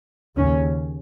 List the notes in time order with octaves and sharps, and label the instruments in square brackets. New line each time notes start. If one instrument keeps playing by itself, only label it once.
[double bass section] D#2 C#3 C#4